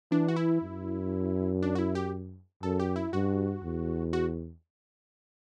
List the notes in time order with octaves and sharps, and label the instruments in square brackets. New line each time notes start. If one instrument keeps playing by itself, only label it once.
[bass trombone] E3 [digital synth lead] D4
[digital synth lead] F#4
E4
[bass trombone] F#2
[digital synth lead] D4
F#4
E4
G4
[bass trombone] F#2 [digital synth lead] A4
[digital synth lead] G4
E4
[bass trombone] G2 [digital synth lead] F#4
[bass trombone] E2
[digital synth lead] F#4